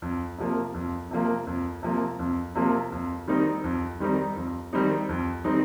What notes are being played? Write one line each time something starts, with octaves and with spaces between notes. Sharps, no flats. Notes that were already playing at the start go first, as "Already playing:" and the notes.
F2
C3 F3 A#3
F2
C3 F3 A#3
F2
C3 F3 A#3
F2
C3 F3 A#3
F2
D#3 G3 C4 D#4
F2
D#3 G3 C4 D#4
F2
D#3 G3 C4 D#4
F2
D#3 G3 C4 D#4